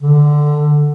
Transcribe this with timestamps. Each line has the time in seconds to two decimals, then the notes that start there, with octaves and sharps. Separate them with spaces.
0.01 D3